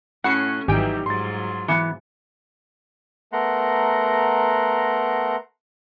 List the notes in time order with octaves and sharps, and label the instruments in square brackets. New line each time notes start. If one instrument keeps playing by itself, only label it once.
[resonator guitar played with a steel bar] A2 F#4 [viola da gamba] C#4 [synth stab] F#5 C7 C#7
[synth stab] G#1 G5 [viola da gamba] E3 F#3 G3 [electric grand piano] D#4 G4 [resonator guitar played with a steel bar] G#5
[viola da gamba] G#2 F#3 F4 [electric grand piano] C6 A6
[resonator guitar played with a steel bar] E3 B3
[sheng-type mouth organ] A3 B3 A#4 F#5 A#5 C6